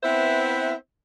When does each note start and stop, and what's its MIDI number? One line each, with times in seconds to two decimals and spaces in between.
0.04 0.74 59
0.04 0.74 60
0.04 0.74 64
0.04 0.74 71
0.04 0.74 72
0.04 0.74 76